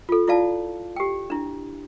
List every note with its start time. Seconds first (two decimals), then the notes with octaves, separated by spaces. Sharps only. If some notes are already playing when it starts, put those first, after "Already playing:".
0.09 F4 A4
0.28 E4 F4 D5 F5 A5
0.96 G4 G5
1.30 D4 E4